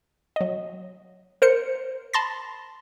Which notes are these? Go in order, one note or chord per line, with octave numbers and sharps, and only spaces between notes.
F#3 D#5
A#4 C5 C#7
A5 B5 C6 A6 A#6